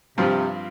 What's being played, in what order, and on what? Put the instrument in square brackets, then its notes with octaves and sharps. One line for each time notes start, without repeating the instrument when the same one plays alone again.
[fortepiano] G2 F3 C4 F4 [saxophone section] C3